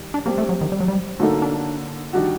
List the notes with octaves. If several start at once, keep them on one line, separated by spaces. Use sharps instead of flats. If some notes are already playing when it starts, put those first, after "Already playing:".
Already playing: D#3 G3
D4
G3 A#3 C4 G4
A3
F#3
D#3
G3
F#3
G3
D3 F#3 A3 A#3 D#4 A4
D4
D#3 G3 D4 F#4